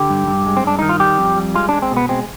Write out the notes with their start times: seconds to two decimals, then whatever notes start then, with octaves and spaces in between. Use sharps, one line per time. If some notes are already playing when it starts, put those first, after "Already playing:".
Already playing: D3 G4
0.10 G2
0.27 G2
0.46 G#3
0.57 C4
0.65 G2 D4
0.79 D#3 D#4
0.89 F4
1.00 G3 G4
1.18 F2
1.36 G3
1.54 G#3 F4
1.69 G#3 D4
1.82 C4
1.91 B2
1.97 B3
2.09 G#3 C4